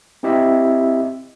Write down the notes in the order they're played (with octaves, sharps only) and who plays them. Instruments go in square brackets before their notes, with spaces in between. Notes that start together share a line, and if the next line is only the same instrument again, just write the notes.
[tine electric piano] C4 E4 G4 D#5 E5